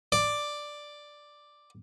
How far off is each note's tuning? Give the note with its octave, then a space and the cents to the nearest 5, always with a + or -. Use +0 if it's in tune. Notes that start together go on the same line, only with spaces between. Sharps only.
D5 +5